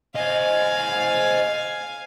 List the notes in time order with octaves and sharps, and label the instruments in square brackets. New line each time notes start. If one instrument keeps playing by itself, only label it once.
[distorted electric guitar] C5 D#5 [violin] F5 G#5